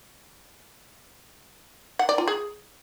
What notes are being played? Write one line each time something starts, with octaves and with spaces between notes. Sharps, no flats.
F#5
D5
F4
G#4